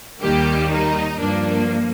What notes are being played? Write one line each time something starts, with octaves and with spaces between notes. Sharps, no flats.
D#2 D#3 G3 A#3 G4
D#4
G2 F3 A#3 D4